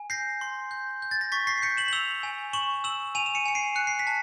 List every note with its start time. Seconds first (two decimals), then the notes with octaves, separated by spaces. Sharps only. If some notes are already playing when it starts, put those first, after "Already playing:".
Already playing: G#5
0.10 G6 A#6 C7
0.41 C6
0.71 G6
1.02 G6
1.11 A6
1.21 A#6
1.32 C#6 A6 B6
1.47 A#6 C7
1.58 C7
1.62 G6 B6 C#7
1.77 E7 F#7
1.88 F#7
1.92 E6 F7 G7
2.23 G#5
2.53 C#6 E7 F#7
2.84 E6 E7 F#7
3.15 G#5 D#7 F7
3.26 E7
3.35 C#7 D#7
3.46 G#5 C#7
3.55 C7 D7
3.76 F#6 C#7
3.87 C7
3.99 B6
4.07 A5